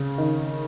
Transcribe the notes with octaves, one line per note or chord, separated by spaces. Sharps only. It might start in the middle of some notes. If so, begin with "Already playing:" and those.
Already playing: C#3
D#3